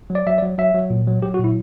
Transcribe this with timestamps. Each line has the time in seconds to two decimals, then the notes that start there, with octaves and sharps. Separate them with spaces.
0.10 F#3
0.15 D5
0.27 F#3 E5
0.38 D5
0.42 F#3
0.58 F#3 E5
0.74 F#3
0.90 A#2
1.07 F#3
1.22 F#3 G4
1.34 F#4
1.39 A#2 E4